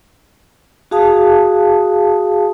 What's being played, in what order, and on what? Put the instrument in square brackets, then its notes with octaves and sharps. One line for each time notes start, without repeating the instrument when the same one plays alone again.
[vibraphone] F#4 G#4 F5 A5 D#6